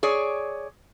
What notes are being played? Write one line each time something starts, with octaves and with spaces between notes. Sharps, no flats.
G#4 C#5 D5